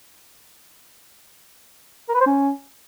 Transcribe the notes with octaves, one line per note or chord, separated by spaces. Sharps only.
A#4
B4
C5
C#4